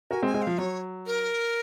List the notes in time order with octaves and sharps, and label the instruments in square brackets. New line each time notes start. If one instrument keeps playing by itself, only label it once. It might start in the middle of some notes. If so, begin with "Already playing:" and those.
[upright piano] F#4 A#4 [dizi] G#5
[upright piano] G#3 C4
[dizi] G#5
[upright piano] G#3 C4
[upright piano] F3 [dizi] F5
[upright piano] F#3 [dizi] C#5
[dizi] A#4